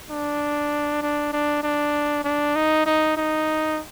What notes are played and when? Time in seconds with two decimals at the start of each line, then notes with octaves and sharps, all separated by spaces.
0.10 D4
1.02 D4
1.33 D4
1.63 D4
2.24 D4
2.56 D#4
2.86 D#4
3.17 D#4